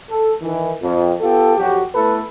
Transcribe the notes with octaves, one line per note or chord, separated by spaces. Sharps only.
A4
D#3 E3
F2
B3 F4 G4 A4
F2 F#3 F#4 G4
A3 B3 E4 A4 B4